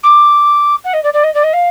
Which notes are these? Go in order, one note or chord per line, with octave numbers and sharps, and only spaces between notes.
D6
F#5
D#5
D5
D5
D#5
D5
D#5
F5